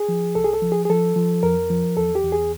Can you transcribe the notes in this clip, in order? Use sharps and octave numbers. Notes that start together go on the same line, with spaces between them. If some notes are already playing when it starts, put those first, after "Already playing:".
Already playing: G#4
F3
C2 A4
G#4
A4
F3
G#4
G#4
F3 A4
F3
F2 A#4
F3
E2 A4
G4
E2
G#4